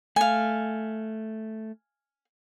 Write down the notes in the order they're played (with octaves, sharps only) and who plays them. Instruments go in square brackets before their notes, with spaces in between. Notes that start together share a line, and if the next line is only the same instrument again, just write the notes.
[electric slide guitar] A3 [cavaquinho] F5 G#5